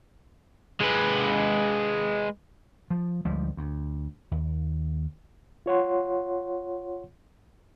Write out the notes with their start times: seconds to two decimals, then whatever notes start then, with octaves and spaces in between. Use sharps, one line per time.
0.80 G#3 B4
2.90 F3
3.25 D2 F3 G3 G#3
3.57 D2
4.31 D#2
5.66 F4 C#5 F#5 C6